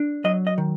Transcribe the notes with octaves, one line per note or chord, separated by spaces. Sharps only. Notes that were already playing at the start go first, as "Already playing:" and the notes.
Already playing: D4
F#3 D#5
D#5
D#3